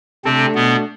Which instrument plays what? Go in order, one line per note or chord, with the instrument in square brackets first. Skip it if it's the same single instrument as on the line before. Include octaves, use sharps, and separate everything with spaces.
[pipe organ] C3 C4 [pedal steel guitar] A3 D4 A4
[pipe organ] B2 B3